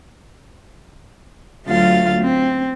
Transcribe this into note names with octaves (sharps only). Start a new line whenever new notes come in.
D2 F#3 A3 F4 F5 A6
C4